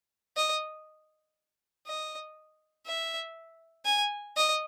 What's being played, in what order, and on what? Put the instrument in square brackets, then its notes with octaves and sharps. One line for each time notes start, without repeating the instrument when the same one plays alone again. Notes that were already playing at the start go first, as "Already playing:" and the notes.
[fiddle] D#5
D#5
E5
G#5
D#5